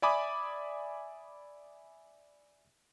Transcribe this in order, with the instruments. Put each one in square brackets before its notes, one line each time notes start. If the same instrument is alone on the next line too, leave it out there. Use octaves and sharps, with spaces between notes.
[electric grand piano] D5 E5 G#5 B5 D6 D#6